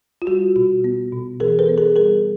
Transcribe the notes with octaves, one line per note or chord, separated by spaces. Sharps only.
F4
G3 F#4
B2 F#4
B3
B2
E3 G#4 A#4
A4 B4
B3
G#4 A#4
G3 G#4 A#4